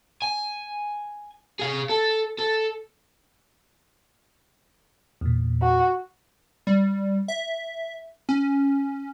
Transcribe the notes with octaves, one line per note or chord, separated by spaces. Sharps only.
G#5
G#4 F5
A4
A4
E2 A#2
F#4
G3
E5
C#4